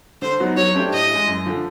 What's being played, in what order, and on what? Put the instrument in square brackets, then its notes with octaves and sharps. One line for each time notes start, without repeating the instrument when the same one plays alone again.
[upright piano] D3 [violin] C5
[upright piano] F#3 B3 D#4 F#4
[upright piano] F#3 [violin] C#5
[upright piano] A3 D4 G4 C5
[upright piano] A2 [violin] D#5
[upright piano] E3 G#3
F#2
D3 F3